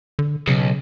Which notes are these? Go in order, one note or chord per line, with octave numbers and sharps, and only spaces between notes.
D3
B1 C#3